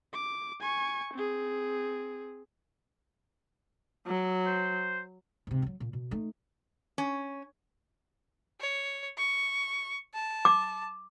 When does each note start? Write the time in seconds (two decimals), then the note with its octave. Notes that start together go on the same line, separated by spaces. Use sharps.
0.14 D6
0.61 G#5 C#6
1.14 C4 G#4
4.07 F#3
4.46 C5
5.47 G#2 C3
5.62 F3 F#3
5.80 A#2
5.93 B2
6.11 A3 D#4
6.98 C#4
8.60 C#5
9.18 C#6
10.14 A5
10.45 D6